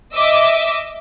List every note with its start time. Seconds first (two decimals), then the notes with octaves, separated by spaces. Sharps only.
0.14 D#5 E5 D6 E6